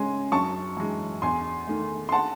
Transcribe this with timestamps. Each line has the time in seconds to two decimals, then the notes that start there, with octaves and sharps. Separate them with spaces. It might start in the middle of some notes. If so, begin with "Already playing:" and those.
Already playing: C#3 G#3 G#5 C6
0.32 F#2 A5 C#6
0.77 E3 G#3
1.22 E2 G#5 C6
1.67 D#3 A3
2.09 C6
2.12 F#5 A5